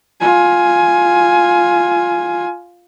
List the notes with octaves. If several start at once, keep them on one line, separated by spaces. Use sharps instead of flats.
F4 G#5